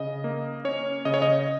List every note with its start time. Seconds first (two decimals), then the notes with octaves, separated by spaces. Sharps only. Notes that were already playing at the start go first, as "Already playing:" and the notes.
Already playing: C#3 D#5
0.24 A#3
0.64 C#4 C#5
1.05 C#3 D#5
1.14 C#5
1.22 D#5